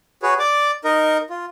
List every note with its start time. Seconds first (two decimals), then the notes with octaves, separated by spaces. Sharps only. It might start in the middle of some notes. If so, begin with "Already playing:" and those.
0.23 F#4 G#4 B4 C#5
0.39 D5 D6
0.84 D#4 A#4 D#5
1.30 F4